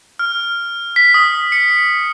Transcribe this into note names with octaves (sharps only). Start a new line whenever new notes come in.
F6
B6
D#6
C#7